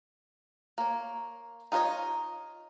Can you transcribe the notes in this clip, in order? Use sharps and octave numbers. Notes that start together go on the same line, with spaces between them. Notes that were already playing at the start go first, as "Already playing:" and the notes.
A#3 C#5
D#4 F4 B4 C#5 D#5